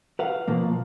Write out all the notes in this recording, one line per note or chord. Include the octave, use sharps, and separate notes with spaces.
B4 F5 F#5
B2 F3 A#3